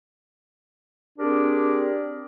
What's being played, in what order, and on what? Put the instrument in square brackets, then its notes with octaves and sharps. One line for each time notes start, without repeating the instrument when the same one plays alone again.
[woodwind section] C4 D4 G4 G#4 A#4 D5